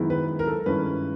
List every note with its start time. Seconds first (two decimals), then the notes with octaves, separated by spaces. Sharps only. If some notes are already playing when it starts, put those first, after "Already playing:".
Already playing: F#2 D#3 G#3 B3 E4
0.10 B4
0.39 A#4
0.47 A4
0.66 G2 D#3 G#3 C#4 E4 B4